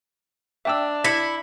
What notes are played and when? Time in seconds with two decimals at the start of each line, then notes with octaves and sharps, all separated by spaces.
0.65 D4 E5 G5 E6
1.04 E4 B6 C#7